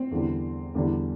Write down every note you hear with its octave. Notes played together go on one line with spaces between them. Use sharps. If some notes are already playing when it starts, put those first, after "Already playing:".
Already playing: C4
E2 D3 G3
E2 D3 G3